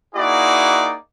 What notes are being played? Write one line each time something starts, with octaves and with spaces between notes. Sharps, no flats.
A#3 D#4 E4 F#4 G#4 D5